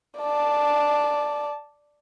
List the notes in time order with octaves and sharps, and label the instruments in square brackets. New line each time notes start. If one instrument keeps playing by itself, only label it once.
[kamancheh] D5 A5